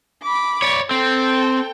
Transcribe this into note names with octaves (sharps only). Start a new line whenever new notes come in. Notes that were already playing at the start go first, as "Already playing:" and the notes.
B5 D6
C#5 D5
C4 A4 G5